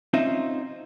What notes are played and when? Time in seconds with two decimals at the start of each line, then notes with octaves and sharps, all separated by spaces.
0.14 C4 C#4 D#4 F4 C5 E5